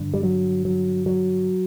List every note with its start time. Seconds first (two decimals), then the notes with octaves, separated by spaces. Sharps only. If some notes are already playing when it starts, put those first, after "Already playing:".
Already playing: G2 D3
0.14 G3
0.23 F#3
0.65 F#3
1.06 F#3